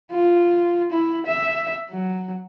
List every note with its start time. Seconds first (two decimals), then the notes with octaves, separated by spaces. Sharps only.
0.12 F4
0.91 E4
1.26 E5
1.90 F#3